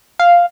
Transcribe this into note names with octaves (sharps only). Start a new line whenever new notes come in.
F5